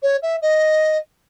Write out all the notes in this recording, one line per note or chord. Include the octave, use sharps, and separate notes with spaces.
C#5
E5
D#5